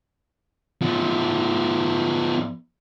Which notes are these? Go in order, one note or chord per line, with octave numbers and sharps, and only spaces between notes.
F3 B3